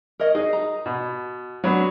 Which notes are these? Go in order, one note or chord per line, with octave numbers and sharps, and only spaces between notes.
A#4 C#5 D#5
D#4 G#4
A#5
B2
F#3 B3 D4